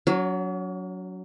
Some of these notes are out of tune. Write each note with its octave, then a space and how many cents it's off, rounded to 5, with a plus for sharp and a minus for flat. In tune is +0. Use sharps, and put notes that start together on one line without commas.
F#3 +0 C#4 +45